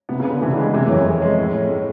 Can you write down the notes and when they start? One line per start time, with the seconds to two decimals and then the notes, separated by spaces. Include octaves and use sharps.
0.09 C3 B3
0.20 C#3
0.25 B3
0.31 D3
0.41 C3 E3
0.48 D3
0.53 C#3
0.57 G#3
0.63 D3
0.74 C3 E3
0.87 F#2 C#4
0.95 F2
1.05 C#4
1.22 G#3
1.38 A2
1.54 C#4
1.70 A2